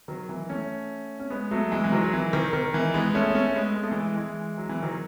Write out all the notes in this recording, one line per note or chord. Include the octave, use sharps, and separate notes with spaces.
D#3 F#3
E3
A3 C#4
C#4
G#3 B3
F#3 A3
E3 G#3
E3
D#3 F#3
F#3
E3
D#3
D#3
E3
G#3 B3
B3
A3 C#4
A3 C#4
G#3 B3
G#3
A3
E3 G#3
E3 G#3
F#3
E3
D#3 F#3